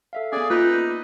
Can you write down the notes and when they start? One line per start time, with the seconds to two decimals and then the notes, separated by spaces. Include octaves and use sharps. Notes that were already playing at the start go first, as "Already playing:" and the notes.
0.13 A4 E5 F5
0.32 B3 C#4 G#4 D5
0.50 A#3 D#4 F4 B4 E6 G6